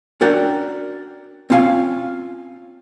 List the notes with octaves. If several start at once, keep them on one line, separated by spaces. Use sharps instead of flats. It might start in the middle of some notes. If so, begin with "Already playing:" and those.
C#4 D4 F#4 A#4 D5 G5
C4 C#4 F4 F5 G#5